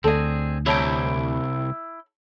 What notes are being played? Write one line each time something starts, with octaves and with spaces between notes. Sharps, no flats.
D2 C4 G#4 A4 D5 D#5
C2 E4 C#5 G5 A5